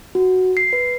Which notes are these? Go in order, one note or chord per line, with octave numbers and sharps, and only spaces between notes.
F#4
C7
B4